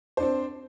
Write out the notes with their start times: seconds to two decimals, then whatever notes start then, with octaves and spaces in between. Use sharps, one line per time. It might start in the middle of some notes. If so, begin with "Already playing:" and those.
0.17 C5
0.20 D4
0.23 C4